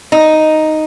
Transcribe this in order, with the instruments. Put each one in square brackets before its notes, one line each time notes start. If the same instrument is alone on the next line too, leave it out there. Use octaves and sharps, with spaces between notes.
[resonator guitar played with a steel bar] D#4